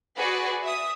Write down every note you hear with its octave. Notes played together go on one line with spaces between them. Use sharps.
F#4 G#4 B4 D5
E5 D#6